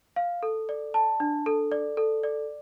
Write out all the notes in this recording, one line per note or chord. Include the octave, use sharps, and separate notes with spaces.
F5
A4
D5
A5
D4
A4
D5
A4
D5